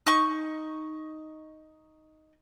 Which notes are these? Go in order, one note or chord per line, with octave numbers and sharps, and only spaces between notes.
D#4 C#6